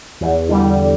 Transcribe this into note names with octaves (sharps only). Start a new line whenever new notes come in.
E2
D3 G3